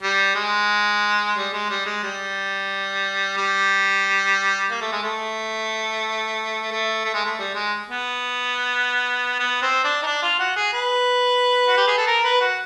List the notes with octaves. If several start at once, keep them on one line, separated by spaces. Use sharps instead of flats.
G3
G#3
G3
G#3
G3
G#3
G3
G3
A#3
A3
G#3
A3
A3
A3
G#3
A3
G3
G#3
B3
B3
C4
D4
D#4
D4
F4
F#4
G#4
B4
F#4
G4
G#4
A4
A#4
B4
F#4